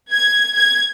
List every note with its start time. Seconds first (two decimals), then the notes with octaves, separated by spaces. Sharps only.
0.12 G#6
0.54 G#6